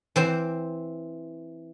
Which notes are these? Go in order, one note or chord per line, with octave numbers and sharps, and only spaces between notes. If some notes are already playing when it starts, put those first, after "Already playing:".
E3 C4 C5